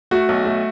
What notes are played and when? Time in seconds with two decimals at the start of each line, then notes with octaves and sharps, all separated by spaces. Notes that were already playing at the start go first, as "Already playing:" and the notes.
0.11 A3 F#4
0.29 B1
0.45 A3